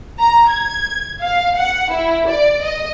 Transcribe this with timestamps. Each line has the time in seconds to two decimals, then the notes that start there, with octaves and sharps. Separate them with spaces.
0.19 A#5
0.49 G#6
1.21 F5
1.57 F#5
1.92 E4
2.28 D5
2.62 D#5